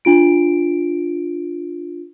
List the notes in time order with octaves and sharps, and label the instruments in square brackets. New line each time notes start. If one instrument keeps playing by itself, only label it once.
[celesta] D4 F4 D7